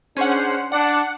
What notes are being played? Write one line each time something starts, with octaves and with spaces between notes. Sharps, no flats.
C#4 D4 G#4 C5 F#5
D4 F#5